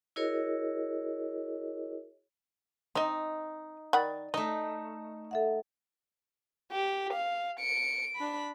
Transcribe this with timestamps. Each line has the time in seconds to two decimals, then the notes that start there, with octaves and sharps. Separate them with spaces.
0.16 E4 F#4 G#4 A#4 C#5 D#5
2.95 C4 D#4 D#5
3.93 D#3 D5 F#5 B5 A6
4.34 A3 D#4 D#5
5.31 A4 E5 F#5
6.72 G4
7.13 F5
7.60 C#7 D7
8.16 D4 B5